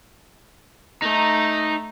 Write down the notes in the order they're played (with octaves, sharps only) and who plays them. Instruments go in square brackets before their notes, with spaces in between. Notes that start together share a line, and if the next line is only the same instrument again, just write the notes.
[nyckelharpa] A3 A#5 [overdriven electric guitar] D#4